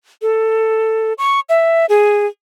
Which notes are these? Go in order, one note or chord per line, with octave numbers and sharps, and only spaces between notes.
A4
C#6
E5
G#4